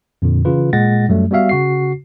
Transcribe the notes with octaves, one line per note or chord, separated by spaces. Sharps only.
F2 A#2 D3
C#3 E3 F4 B4
A#2 G#3 F#5 A6 A#6
F#2 F#3 G3 A3
G3 B3 F#4 E5 F5
C#3 F#4 C7